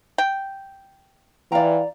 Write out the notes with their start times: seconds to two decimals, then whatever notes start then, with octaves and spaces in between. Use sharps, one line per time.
0.18 G5
1.52 E3 F4 D5 F5 G5 A#5